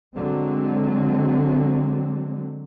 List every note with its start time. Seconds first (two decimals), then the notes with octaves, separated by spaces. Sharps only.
0.17 D3 F#3 G#3 C4